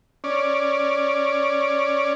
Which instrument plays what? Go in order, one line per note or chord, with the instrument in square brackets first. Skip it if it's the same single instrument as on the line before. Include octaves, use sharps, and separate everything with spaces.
[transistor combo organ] C#4 D5